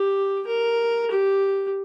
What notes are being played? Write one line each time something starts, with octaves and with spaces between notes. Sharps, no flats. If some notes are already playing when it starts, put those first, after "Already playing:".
Already playing: G4
A#4
G4